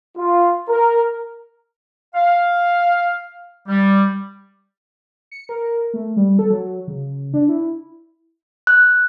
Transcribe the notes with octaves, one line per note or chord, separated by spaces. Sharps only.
F4
A#4
F5
G3
C#7
A#4
A3
G3
A4
F#3
C#3
D4
E4
F#6